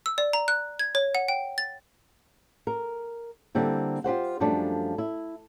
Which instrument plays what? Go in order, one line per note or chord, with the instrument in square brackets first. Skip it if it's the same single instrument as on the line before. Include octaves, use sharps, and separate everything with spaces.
[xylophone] E6
D5
A#5
F#6
G#6
C#5
F#5
G5
A6
[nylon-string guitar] A#4
D3 G3 A#3 C4 E4
F4 G4 C5 F#5
F#2 F3 G3 A3 D4
E4